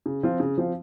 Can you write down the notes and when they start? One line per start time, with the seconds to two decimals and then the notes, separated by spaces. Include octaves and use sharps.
0.06 C#3
0.23 F3 C4 F4
0.40 C#3
0.58 F3 C4 F4